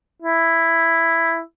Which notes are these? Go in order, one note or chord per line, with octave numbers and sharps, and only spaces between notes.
E4